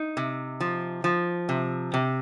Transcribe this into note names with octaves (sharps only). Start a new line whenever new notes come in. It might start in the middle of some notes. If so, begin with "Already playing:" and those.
Already playing: D#4
C3
F3
F3
C3
C3